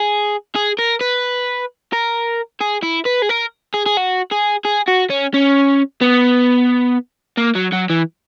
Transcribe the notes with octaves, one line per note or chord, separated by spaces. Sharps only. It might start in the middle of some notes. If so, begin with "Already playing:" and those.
Already playing: G#4
G#4
A#4
B4
A#4
G#4
E4
B4
G#4
A#4
G#4
G#4
F#4
G#4
G#4
F#4
C#4
C#4
B3
A#3
F#3
F#3
E3